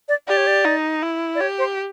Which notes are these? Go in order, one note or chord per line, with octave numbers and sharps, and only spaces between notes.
D5
G4 D5
C#5
D5
D#4
E4
D5
G4 C#5
C5